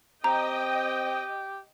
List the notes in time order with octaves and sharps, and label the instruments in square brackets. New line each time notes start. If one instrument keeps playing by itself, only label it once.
[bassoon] C4 [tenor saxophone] G4 [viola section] D#5 G5 [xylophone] A#5